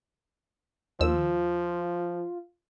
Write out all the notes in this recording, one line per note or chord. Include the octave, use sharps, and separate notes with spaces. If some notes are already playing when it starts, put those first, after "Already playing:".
D#2 F3 F4 E6